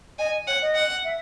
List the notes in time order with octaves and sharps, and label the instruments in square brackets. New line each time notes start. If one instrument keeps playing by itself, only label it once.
[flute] D#5 [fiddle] G#5
[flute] C#5 [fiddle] F#5
[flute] D#5
[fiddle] F#5
[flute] E5